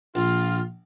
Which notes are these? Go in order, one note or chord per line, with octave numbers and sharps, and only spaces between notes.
A#1 F4